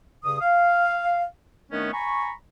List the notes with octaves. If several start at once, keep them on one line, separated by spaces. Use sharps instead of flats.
G2 C#3 D#6
F5
D#3 A3 B3 C#4 D4
G#5 A#5 B5 C#6